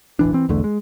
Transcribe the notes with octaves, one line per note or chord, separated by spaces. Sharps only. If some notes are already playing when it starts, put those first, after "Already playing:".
E1 A1 E3 D4
E3 C4
B1 E2 D3 A3
G#3